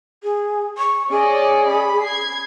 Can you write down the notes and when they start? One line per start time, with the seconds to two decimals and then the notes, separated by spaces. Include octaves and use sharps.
0.23 G#4
0.78 C#6
1.11 C#4 G#4 D5 D#5
1.68 B5
2.05 G#6 C7